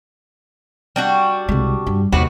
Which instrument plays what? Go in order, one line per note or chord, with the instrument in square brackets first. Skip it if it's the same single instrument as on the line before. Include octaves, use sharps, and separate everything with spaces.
[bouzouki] G3 D4 F#4
[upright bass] C2 G#3
G2
[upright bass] D#2 [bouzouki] C3 F#4 B4